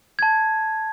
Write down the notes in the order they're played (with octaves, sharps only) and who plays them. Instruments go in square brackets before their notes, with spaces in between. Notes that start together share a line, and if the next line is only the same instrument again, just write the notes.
[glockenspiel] A5 G#6